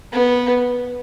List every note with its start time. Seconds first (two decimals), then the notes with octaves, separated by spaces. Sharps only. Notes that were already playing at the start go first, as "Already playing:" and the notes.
0.13 B3